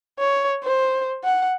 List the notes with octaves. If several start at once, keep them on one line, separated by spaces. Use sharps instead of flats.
C#5
C5
F#5